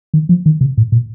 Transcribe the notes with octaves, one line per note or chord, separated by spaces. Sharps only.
D#3
F3
D#3
C3
A2
A#2